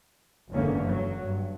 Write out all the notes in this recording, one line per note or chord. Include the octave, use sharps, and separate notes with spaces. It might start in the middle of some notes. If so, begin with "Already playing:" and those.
F#1 E2 G#2 D3 A#3 C#4
G2 F#3
G2